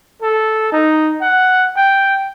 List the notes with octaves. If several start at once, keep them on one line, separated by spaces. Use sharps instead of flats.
A4
D#4
F#5
G5